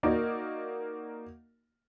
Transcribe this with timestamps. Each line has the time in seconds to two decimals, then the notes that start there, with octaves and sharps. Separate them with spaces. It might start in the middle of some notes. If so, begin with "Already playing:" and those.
0.03 A#3 D#4 F#4 A#4 D5